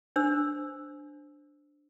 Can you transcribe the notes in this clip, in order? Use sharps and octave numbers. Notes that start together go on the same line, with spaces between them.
D4 C5 E6